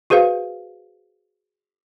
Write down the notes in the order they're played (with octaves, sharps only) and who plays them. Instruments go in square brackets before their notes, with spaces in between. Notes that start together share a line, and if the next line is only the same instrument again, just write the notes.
[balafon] F#4 G#4 B4 C5 F5